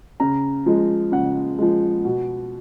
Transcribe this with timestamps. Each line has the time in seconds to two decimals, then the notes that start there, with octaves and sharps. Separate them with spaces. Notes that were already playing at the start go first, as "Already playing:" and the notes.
0.20 C#3 A#5
0.66 F3 G#3
1.12 C#3 F#5
1.59 F3 G#3
2.05 B2